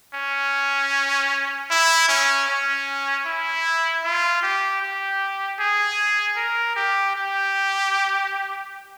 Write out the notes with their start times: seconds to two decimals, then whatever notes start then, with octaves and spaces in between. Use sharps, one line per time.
0.14 C#4
1.71 E4
2.09 C#4
2.48 C#4
3.26 E4
4.04 F4
4.43 G4
4.82 G4
5.60 G#4
6.37 A#4
6.76 G4
7.16 G4